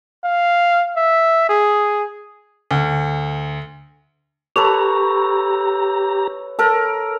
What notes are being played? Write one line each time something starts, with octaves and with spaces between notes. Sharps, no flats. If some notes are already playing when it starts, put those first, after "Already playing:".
F5
E5
G#4
D2
G4 A4 B4 C#5 A#5
A4 A#4